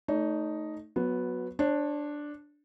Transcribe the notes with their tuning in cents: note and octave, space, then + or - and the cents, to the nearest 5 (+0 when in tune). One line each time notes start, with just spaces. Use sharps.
A3 +0 D#4 +0 C#5 +45
F#3 -15 B3 +0
D4 +0 C#5 -40